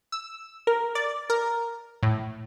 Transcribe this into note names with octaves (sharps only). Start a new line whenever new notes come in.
E6
A#4
D5
A#4
A2